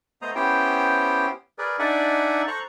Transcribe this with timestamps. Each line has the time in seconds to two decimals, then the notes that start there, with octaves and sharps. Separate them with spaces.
0.22 A3 B3 C5 D#5 A#5 D#6
0.35 B3 C#4 E4 G4 C5 G5
1.58 G#4 A#4 B4 D5
1.79 D4 D#4 D5 E5 F#5 G#5
2.47 A4 C5 A#5 C#6 F#6